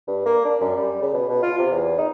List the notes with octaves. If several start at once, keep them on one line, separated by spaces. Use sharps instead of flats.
G2
A#3
D4
F#2
G3
C#3
B2
B2
F4
C3
E2
D#4